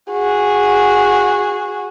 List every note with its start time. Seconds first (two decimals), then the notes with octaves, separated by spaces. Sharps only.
0.12 F#4 G#4